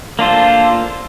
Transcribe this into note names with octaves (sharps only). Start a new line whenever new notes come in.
A#3 D4 F4 A4 C5